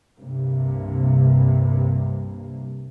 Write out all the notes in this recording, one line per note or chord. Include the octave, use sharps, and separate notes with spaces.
C2 G2 C3 A#3